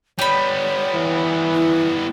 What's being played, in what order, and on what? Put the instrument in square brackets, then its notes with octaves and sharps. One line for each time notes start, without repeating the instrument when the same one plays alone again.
[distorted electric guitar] G3 B3 [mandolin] G4 B5 [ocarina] C#5
[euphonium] E3
[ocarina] E4